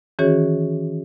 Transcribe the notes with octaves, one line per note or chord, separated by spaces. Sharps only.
D#3 E3 C#4 F#4 G#4 C#5